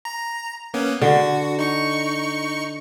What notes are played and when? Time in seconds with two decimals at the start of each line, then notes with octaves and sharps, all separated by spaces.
0.05 A#5
0.74 A#3 B3 C#4
1.02 D3 F#4
1.59 D#4 C#6 C#7